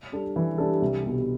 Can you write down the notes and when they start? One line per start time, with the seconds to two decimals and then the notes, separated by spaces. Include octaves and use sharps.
0.12 G3 D4 A4
0.36 E3
0.58 G3 D4 A4
0.82 C2
1.04 B2 G3